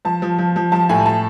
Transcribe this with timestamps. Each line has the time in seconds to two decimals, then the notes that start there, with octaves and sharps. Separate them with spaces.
0.05 F3 A5
0.22 F3
0.39 F3
0.56 F3
0.72 F3 A5
0.89 A2 G#5
1.06 A5